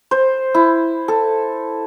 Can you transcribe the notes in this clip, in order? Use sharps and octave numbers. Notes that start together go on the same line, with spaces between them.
C5
E4
A4